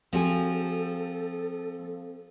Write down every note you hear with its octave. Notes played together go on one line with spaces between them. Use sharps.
F3 C4 F#4 G#4 A4